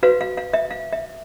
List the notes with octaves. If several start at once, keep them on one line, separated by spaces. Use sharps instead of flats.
F#4 B4 F5
F5
F5
E5
F5
E5